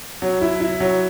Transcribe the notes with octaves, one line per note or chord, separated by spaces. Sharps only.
F#3
E4
E4
F#3